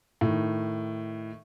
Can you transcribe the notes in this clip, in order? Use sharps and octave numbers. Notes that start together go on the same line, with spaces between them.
A2 D#3